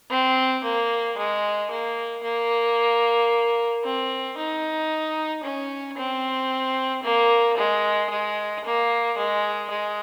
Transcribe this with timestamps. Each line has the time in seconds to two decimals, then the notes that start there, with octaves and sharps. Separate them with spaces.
0.10 C4
0.64 A#3
1.18 G#3
1.71 A#3
2.23 A#3
3.84 C4
4.37 D#4
5.43 C#4
5.97 C4
7.04 A#3
7.58 G#3
8.10 G#3
8.65 A#3
9.17 G#3
9.70 G#3